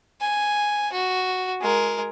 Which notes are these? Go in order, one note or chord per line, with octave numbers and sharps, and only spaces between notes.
G#5
F#4
G#3 A#4